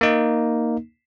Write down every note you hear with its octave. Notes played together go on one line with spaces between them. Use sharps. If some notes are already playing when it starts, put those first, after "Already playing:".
A#3 D#4